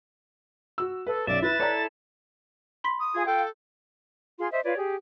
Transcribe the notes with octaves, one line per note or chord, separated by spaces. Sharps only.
F#4 E6
A4 B4
B1 F#2 D5 E5 A6
E4 B4 A6
E4 A4 C#5 D5 A#5
B5 C6 B6
D#6
F4 G#4
F4 A4 F5 G5
F4 G#4 C6
C5 D#5 E5
F4 B4 C#5 D5
G4 G#4